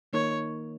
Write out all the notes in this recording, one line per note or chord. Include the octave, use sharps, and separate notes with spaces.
D#3 A#3 D#4 A#4 C#5